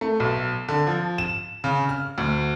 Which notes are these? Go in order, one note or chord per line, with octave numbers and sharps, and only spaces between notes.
A3
B1
D3
F3
E7
C#3
F6
D2